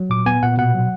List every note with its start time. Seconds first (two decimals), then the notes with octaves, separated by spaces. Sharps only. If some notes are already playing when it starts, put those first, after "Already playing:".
Already playing: F#3
0.10 A#2 D6
0.26 B3 G#5
0.43 A#2 F#5
0.57 B2 F#5
0.75 F#3